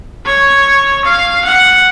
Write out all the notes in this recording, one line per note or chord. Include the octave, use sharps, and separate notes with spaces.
C#5
F5
F#5